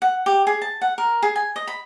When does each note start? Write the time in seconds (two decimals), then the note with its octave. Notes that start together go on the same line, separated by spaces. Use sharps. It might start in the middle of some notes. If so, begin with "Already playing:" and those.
0.02 F#5
0.26 G4
0.47 G#4
0.62 A5
0.81 F#5
0.98 A#4
1.22 G#4
1.36 G#5
1.56 D#5
1.67 B5